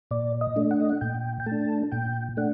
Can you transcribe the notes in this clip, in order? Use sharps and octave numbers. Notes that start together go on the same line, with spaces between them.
A#2 D5
D#5
A3 D4
F#5
D#5
F#5
A#2 G5
G5
A3 A5
D4
A#2 G5
A3 D4 F#5